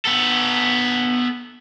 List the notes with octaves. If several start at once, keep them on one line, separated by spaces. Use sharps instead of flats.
B3 A4